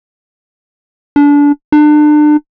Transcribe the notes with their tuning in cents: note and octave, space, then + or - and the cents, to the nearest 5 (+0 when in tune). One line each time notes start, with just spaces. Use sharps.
D4 -25
D4 +35